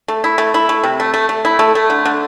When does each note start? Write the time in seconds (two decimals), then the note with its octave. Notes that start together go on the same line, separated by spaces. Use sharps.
0.08 A3
0.24 E4
0.38 A3
0.54 E4
0.69 A3
0.84 C3
1.00 A3
1.14 A3
1.29 A3
1.45 E4
1.59 A3
1.75 A3
1.90 D3
2.05 D3